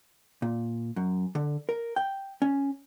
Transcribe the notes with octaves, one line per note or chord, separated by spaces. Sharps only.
A#2
F#2
D3
A#4
G5
C#4